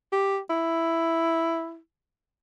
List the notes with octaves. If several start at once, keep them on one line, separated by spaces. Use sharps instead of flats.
G4
E4